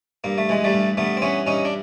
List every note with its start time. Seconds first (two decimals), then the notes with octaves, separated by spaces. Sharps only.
0.24 G2 A#3
0.38 A3
0.49 E3 G#3
0.64 G3 A3
0.74 G2
0.97 G2 A3 B3
1.17 C4
1.22 E3 B3 C#4
1.47 G2 C#4 D#4
1.65 D4